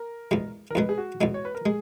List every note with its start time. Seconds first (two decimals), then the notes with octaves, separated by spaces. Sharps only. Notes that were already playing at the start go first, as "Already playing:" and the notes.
Already playing: A#4
0.31 E2 B2 G#3
0.70 A#4
0.75 E2 B2 G#3 B4
0.89 G#4
0.98 F#4
1.21 E2 B2 G#3
1.34 C#5
1.45 B4
1.55 A#4
1.66 G#3 G#4